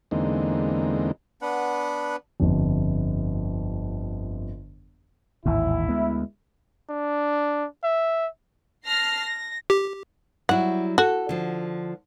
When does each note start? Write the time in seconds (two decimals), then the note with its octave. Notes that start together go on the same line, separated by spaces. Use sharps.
0.11 E2 D3 G#3 A#3 C4 D#4
1.42 B3 D4 B4 F#5
2.40 G1 F2
5.46 A1 D#2 G#2 E4
5.88 D2 G#3 B3
6.89 D4
7.84 E5
8.86 A5 F6 A#6 C7
9.20 A#6
9.70 G4
10.49 F#3 G3 E4 F#5
10.98 F#4 A4
11.29 D3 F3